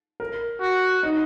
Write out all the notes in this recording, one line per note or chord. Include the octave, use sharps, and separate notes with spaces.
A#4
F#4
D#4